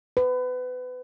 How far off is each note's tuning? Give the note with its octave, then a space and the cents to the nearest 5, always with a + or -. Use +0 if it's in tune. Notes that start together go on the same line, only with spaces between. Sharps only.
B4 +30